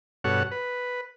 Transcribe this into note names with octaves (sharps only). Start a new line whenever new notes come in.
G2 B2 F#4 A4 C#5 F#5
B4